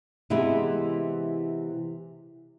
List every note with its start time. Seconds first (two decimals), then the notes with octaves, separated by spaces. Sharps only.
0.30 C3 E3 G#3 B3 E4